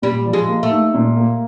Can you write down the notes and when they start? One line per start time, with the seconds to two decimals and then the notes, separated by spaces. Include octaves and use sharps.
0.02 A#2 G3
0.25 F3
0.33 G#3
0.48 A#3
0.63 A3
0.70 D#4
0.94 A#2
1.16 A#3